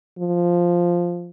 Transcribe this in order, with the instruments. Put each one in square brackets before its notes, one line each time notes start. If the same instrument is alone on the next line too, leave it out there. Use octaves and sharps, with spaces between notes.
[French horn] F3